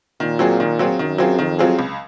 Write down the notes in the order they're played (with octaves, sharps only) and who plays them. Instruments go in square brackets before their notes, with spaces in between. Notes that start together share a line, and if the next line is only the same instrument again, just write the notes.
[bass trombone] A#2 [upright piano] D#3
[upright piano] F#3 C4 F4 G#4
D#3
F#3 C4 F4 G#4
[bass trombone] F#2 [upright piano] D#3
[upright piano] F#3 C4 F4 G#4
[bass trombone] F2 [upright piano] D#3
[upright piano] F#3 C4 F4 G#4
C#2